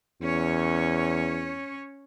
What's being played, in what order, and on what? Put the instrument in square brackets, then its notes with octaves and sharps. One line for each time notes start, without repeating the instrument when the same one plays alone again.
[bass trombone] E2 [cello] C#4 C#5